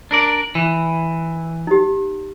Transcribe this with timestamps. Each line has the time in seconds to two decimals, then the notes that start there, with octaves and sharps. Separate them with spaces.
0.11 D4 A#4 D5
0.55 E3
1.67 D#4 G4